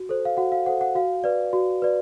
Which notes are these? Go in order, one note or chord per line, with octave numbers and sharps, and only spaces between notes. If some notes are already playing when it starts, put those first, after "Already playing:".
Already playing: F#4
A4 C5
F5
F#4 F#5
F5
A4 C5 F#5
F#5
F#4 F5
B4 D5
F#4
B4 D5